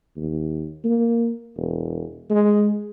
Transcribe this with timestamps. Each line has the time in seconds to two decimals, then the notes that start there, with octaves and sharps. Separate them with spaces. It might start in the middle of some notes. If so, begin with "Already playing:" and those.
0.17 D#2
0.84 A#3
1.56 E1
2.30 G#3